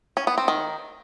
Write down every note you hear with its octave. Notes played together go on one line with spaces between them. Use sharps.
C#4
B3
C4
D#3